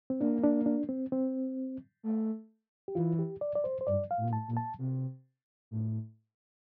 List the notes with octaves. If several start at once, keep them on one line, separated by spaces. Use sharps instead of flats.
C4
A#3 D4
D4
D4
C4
C4
A3
G4
E3 F4
G4
D5
D5
C5
C5
G2 D5
F5
A2
A#2
A2 A5
A#2
A5
C3
A2